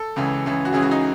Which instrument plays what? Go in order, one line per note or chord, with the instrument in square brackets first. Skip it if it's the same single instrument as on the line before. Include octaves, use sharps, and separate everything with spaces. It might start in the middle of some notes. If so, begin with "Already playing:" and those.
Already playing: [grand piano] A4
C#2 C#3 E3
C#2 C#3 E3
F#4
C#2 C#3 E3 G#4
F#4
D#4